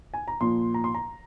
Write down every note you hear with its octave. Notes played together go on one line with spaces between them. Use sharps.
G#5
A#5
A#2 F3 A#3 C6
A#5
C6
A#5